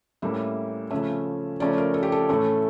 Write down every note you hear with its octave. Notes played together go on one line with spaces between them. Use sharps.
A2 G3 A#3 C#4 E5
C#3 F3 A3 C#4 E5
C#3 F3 A3 C#4 D5
A#4
A4
G4
A4
A2 E3 A3 C#4